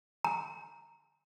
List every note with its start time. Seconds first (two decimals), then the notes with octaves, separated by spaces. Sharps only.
0.25 A#5